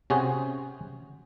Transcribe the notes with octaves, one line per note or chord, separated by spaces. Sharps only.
C3 C#4 F#4 G#4 C5